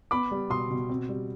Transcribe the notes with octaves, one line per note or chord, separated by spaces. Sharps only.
B3 B5 D6
G3
B2 C6 D#6
B2
C4
G3